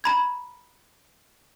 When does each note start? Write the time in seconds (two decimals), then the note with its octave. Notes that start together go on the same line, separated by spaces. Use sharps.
0.04 A#5 B5 G#6